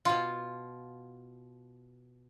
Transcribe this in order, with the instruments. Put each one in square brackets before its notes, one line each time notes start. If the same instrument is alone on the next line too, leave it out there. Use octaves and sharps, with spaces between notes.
[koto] B2 F4